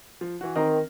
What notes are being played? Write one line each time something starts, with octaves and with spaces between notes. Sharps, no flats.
F3
E3 F#4
D#3 C4 A#4 D#5